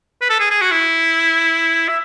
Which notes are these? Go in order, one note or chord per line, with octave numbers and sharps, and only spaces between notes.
B4
A4
G#4
G#4
F#4
E4
E5